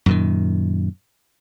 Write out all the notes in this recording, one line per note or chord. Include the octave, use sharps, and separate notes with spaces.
F#2 A#2 D#3